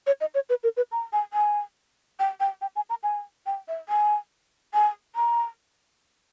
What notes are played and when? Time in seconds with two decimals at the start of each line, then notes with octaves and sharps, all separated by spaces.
0.07 C#5
0.20 D#5
0.34 C#5
0.49 B4
0.63 A#4
0.77 B4
0.91 A#5
1.13 G#5
1.33 G#5
2.19 G5
2.40 G5
2.61 G5
2.76 G#5
2.90 A#5
3.03 G#5
3.46 G5
3.68 E5
3.89 G#5
4.74 G#5
5.16 A#5